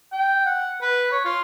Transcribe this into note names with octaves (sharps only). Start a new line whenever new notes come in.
G5
F#5
B4
C#5
F4